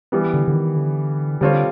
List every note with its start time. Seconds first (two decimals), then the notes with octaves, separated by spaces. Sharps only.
0.12 E3 G3 B3
0.34 D3
0.48 D3
0.55 D#3
0.76 D3
1.41 D3 G3 C4 F4 A4 C#5